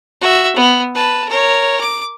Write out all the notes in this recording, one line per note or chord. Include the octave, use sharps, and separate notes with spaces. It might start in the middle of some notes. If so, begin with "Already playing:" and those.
F#4 E5
B3
B4 A5
A#4 C#5
D6